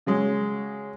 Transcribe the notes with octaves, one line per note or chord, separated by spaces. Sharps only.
C#3 F#3 G#3